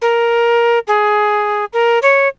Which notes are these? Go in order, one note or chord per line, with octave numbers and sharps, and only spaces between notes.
A#4
G#4
A#4
C#5